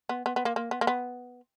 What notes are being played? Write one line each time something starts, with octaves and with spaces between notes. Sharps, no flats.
B3
B3
B3
A#3
A#3
B3
A#3
B3